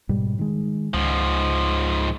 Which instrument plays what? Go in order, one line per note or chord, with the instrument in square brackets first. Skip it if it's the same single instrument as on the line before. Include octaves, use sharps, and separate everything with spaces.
[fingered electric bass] G#2 B2 G3
D#3 G#3
[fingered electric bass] C#2 [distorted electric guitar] G#2 F3